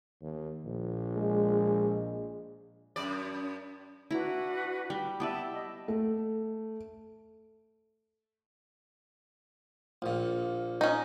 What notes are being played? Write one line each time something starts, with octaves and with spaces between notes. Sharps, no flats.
D#2
A#1
G#3
F#2 D5
D4 E4 F#4 B4 A#5
G3
B3 E4 G4 B4 D5 A5
D#5
A3
A#1 A#2
C#4 D#4